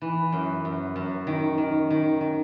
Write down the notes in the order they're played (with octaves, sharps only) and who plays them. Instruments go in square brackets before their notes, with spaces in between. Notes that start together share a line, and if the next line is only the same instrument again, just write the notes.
[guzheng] E3
F#2
F#2
F#2
D#3
D#3
D#3
D#3